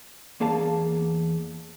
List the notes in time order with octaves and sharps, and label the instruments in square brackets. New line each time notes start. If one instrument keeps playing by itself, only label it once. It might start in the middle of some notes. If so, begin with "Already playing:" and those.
[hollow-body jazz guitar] E2 A#3 G#4 F5 A5